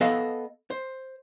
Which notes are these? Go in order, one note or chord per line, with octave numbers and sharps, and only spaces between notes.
B3 A4 D#5 F5
C5